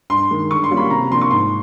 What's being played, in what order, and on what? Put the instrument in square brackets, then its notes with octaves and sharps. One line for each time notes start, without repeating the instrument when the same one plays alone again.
[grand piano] G2 C6
D#3 G#3
D3 C#6
C6
G3 A#3 C#4 F4
B5
C3 A#5
F3 A#3 D4 C6
C#6
G#2 C6